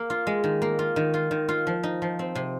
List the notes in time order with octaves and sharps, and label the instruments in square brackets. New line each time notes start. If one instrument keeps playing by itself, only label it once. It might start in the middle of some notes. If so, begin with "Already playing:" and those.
Already playing: [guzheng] A#3
F4
G#3
D#3
A#3
F4
D#3
F4
D#3
F4
F3
D#4
F3
C4
C3